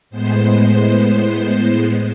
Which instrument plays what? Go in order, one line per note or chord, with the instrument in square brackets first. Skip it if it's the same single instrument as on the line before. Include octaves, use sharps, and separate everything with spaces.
[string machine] A2 G#3 B3 C5